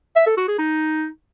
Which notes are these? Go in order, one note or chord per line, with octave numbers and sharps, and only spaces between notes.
E5
A4
F#4
G#4
D#4